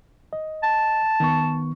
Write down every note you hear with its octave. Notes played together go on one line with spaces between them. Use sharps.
D#5
A5
D#3 B3 C#6